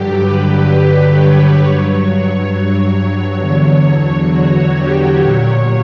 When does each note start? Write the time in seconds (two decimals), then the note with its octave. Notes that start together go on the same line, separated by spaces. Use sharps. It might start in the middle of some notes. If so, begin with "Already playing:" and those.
Already playing: G2 D3 F#3 G4
0.20 B4
0.66 B4
1.11 C#5
1.57 G2 F#3 C#5
3.39 E2 D3 F#3
4.30 F#4
4.75 G4
5.20 A#2 F#3 C#5